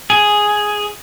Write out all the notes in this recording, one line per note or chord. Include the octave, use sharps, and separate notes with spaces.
G#4